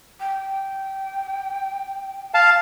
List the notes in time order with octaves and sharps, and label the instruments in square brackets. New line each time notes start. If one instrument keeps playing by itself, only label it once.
[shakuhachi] G5
[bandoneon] F5 A5